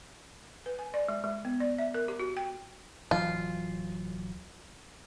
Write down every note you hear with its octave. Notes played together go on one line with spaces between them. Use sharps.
B4
G#5
D5
G#3
G#3
B3
D5
E5
A#4
G4
F#4
G5
D1 E3 F#3 F4